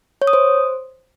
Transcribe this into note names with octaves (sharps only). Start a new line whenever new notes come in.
C#5
D#6
C5